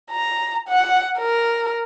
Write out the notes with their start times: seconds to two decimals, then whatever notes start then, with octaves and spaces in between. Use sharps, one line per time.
0.11 A#5
0.69 F#5
1.19 A#4